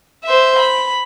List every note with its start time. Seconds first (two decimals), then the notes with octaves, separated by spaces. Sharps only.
0.24 C5 E5
0.59 B5